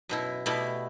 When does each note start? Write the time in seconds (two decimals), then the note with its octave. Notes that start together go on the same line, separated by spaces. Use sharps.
0.09 F#2 B2 E4
0.46 B2 G3 A3 B3 E4